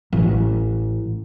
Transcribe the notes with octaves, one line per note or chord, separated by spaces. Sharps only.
A1